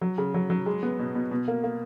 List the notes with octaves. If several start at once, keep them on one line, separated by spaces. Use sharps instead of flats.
F#3
C#3
F#3
F#3
G#3
B3
B2
B2
B2
A#3
A#3